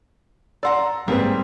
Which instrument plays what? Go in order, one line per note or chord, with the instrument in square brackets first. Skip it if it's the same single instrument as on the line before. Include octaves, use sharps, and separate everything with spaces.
[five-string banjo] D5 F#5 [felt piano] A#5 C6 E6
[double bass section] G#2 C4 [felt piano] G3 [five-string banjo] A#3 G#4 B4